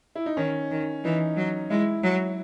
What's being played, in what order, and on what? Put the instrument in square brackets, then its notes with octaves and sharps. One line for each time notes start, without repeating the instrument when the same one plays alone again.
[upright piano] E4
D#4
[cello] D#3 [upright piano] C#4
[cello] D#3
[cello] E3 [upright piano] D#4
[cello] F#3
[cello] G#3 [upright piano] E4
[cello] F#3